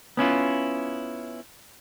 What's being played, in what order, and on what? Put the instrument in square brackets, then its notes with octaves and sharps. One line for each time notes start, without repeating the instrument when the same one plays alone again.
[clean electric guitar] B3 C#4 E4 F4